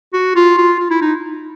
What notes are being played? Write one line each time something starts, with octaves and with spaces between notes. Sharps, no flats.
F#4
F4
F4
F4
E4
D#4